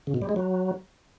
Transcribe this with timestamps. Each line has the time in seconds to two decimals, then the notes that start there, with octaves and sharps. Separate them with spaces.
0.07 C#3
0.14 B2
0.22 G3
0.29 G#3
0.36 F#3